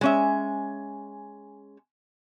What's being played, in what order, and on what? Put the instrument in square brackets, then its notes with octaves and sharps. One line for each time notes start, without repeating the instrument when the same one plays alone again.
[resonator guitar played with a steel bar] G#3 C#4 E5